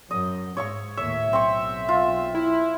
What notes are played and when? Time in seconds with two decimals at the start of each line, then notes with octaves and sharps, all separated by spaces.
0.11 F#2 D#5
0.57 G#2 C#5 E5 C#6
0.97 D#2 A2 C#5 E5
1.33 B1 C4 C#6
1.89 F4
2.35 E4